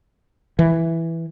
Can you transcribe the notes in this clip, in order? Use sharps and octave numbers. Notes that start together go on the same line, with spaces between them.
E3